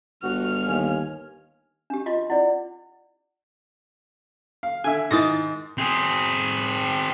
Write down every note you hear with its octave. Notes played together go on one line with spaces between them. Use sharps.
G1 F#4 F6
D#2 G#5
D4 G4
F4 D#5 C6
E4 D5 F#5
F5
D3 E5 G#5
G#2 D#3 E4 D#6 A6 A#6
C4 G#4